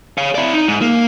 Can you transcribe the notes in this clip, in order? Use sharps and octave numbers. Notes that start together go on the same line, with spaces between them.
C#5 F5
E4 D5
D#4
G#2
A#3